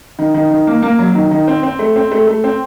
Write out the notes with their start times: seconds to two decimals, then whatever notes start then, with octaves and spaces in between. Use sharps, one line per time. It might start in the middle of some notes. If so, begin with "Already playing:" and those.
0.19 D#3
0.34 D#3
0.51 D#3
0.67 A#3
0.83 A#3
0.99 F#3
1.15 D#3
1.31 D#3
1.47 C4
1.63 C4
1.79 A3
1.96 C4
2.11 A3
2.27 A3
2.44 C4